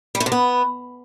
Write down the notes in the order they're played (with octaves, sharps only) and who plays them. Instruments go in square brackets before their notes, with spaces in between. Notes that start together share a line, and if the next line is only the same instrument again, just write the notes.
[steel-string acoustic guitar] G3
A3
C3
B3